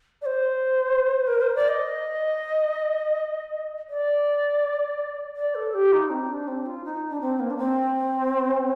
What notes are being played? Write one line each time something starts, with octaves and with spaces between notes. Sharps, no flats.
D5
C5
A#4
C5
D5
D#5
D5
D5
A4
G4
D#4
C4
D4
C4
F4
D#4
D4
C4
A#3
D4
C4